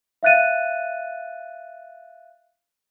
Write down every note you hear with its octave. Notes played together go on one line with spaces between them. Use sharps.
E5 F5 F#6 A6 D#7